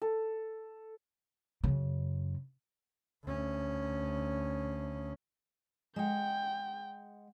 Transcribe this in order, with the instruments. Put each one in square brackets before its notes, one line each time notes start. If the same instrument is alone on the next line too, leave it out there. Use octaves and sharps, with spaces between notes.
[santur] A4
[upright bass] F#2 C#3
[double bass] D2 C#4
[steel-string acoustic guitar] G#3 F#5 [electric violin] G5